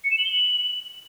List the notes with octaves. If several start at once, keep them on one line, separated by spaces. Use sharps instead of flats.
C#7
E7
F#7
G7
F#7